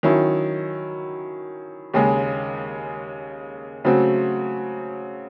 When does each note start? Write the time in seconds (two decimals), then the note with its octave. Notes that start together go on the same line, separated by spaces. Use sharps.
0.03 D#3 F#3 C#4 E4
1.94 D#2 C#3 G#3 C#4
3.84 C#3 F#3 A3 C4 F#4